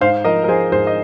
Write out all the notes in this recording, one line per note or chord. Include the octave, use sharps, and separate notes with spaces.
G#2 C5 F5
F3 A#4 D#5
A#4
F3 G#4 C5
G#2 G#4 C5
D#5